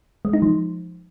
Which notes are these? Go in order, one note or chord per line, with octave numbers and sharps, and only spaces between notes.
G#3
D#4
F3